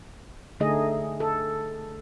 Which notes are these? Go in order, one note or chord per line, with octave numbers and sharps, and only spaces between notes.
D3 A3 D#4 G#4 D#5
A4